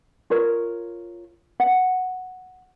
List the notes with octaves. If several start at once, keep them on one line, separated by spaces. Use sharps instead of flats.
F4 A#4 C#5
F#5